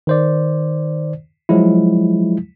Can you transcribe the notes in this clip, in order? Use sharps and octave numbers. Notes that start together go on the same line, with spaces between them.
D#3 C5 D5
F3 F#3 G#3 E4